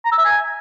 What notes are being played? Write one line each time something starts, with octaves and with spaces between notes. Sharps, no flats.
A#5
E6
E5
G#5